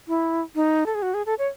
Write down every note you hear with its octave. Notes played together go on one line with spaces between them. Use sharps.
E4
D#4
A4
G#4
F#4
G#4
A4
C#5